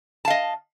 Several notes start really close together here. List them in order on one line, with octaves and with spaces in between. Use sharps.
A5 F5 D#5